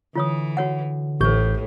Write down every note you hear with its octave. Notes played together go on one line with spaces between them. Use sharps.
D3 E3 F4 C#5 D#6
F#4 C#5 F#5
A1 A2 G4 B4 G6